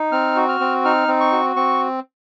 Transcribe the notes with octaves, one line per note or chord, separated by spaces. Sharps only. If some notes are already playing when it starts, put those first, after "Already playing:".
Already playing: D#4
C4 F6
F#4
F6
C4
D#4 F6
C4
C#6
F#4
C4 C#6